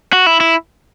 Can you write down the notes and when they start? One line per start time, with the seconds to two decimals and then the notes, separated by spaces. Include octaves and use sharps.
0.13 F#4
0.26 E4
0.40 E4